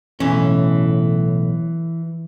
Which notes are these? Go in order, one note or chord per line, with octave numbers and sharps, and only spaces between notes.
B1 A2 E3 C#4